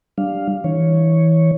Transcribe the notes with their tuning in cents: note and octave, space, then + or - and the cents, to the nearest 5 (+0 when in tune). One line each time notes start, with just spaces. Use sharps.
G3 +0 D4 +0 F5 +0
E3 -25 C#5 +0